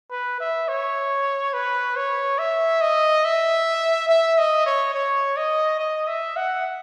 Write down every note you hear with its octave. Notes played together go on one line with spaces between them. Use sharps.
B4
E5
C#5
B4
C#5
E5
D#5
E5
E5
D#5
C#5
C#5
D#5
D#5
E5
F#5